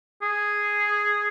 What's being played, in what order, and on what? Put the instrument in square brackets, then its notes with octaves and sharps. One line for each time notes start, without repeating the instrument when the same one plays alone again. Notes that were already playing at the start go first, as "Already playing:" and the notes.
[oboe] G#4